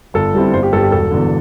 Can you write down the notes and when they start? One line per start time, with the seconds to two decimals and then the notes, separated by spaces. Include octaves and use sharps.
0.14 G1 A4
0.34 G2 G3 C4 E4
0.53 G1 C5
0.63 G4
0.72 G2 A4
0.77 G3
0.83 G4
0.92 E1 A4
1.11 E2 D3